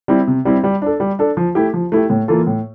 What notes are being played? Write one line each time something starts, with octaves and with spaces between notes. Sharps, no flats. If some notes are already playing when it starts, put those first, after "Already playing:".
G3 C4 E4
C3
G3 C4 E4
G3
D4 A4
G3
D4 A4
F3
A3 E4 G4
F3
A3 E4 G4
A2
E3 A#3 F4 A4
A2